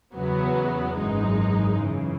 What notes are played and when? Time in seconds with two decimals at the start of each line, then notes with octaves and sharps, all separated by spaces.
0.16 E2 C#3 F#3 B3
0.98 G#1 F#2 E3 G#3 D#4
1.79 F#2 C#3 E3